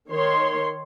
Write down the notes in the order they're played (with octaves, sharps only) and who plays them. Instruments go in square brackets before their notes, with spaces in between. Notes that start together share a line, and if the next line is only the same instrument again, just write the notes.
[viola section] D#3 C#5 C6